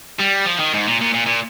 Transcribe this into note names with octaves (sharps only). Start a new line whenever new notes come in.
G3
F3
D#3
G#2
A#2
A#2
A#2
A#2